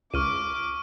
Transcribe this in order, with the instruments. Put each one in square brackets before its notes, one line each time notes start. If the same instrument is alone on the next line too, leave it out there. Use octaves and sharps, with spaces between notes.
[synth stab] C#2 [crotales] C#6 F6 D#7 [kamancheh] D6